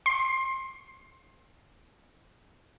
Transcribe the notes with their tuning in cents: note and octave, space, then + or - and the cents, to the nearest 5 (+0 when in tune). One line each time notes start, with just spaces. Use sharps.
C6 +25